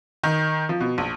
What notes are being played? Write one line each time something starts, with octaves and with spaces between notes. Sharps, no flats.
D#3
F3
B2
A#1